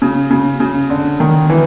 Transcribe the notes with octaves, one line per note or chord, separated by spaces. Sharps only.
C#3
C#3
C#3
D3
D#3
E3